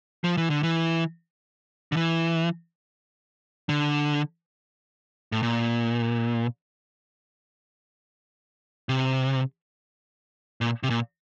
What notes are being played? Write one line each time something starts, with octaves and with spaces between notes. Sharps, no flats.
F3
E3
D3
E3
D3
E3
D3
A2
A#2
C3
A#2
C3
A#2